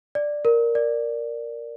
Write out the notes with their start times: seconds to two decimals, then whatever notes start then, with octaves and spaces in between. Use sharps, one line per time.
0.15 D5
0.45 A#4
0.75 D5